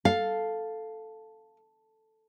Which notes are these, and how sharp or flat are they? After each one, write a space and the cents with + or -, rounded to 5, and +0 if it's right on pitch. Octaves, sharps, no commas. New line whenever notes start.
A4 +0 F5 +0